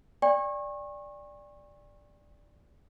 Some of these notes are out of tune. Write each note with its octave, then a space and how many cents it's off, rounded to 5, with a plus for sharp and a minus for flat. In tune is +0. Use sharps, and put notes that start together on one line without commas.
D5 +0 G5 +45 C#6 -30